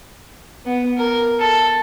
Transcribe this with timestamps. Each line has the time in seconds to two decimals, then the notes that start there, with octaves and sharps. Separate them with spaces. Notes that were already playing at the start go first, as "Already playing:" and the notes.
0.65 B3
0.98 A#4
1.39 A4